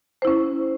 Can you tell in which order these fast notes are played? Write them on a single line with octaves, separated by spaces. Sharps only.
C5 E4 C#4